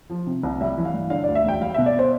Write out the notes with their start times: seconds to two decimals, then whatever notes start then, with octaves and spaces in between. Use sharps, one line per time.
0.10 F3
0.27 C3
0.43 C2
0.61 G3 E5
0.78 E3
0.85 F5
0.94 G2
1.10 D3 F5
1.24 D2 D5
1.35 E5
1.44 E1 G5
1.61 G3 F5
1.74 B2 E5
1.86 D5
1.99 C5